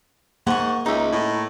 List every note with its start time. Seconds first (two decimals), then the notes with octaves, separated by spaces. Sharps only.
0.47 G#2 A#3 F#5 C#6
0.86 C#2 D#4 E5
1.12 A2